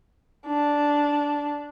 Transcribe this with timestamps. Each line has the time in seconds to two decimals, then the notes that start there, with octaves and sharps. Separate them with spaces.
0.47 D4